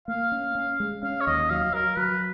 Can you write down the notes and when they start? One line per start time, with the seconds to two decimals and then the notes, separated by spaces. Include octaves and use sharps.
0.08 A#3 F5
0.32 C#4
0.55 C#4
0.80 G#3
1.03 C#4 F5
1.21 C#5
1.27 D#2 D#5
1.50 F#3 F5
1.73 F#3 A#4
1.97 F#3 B4